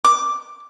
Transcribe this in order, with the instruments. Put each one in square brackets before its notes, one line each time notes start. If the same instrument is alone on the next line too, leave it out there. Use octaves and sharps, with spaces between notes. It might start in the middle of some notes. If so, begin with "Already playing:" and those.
[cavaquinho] D6